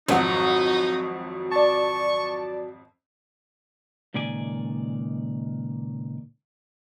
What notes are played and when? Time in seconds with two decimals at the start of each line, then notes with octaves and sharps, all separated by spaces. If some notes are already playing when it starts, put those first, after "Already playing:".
0.08 G#1 F2 F#3 D#4 F#5
1.51 D5 A5 C#6
4.14 C#2 A#2 D#3 D5 G#5